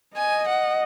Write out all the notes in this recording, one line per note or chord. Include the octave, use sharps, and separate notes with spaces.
D#5 G#5
F#5